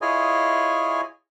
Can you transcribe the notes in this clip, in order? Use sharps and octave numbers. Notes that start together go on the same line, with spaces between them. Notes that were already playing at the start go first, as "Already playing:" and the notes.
E4 F4 G#4 C#5 D#5 G#5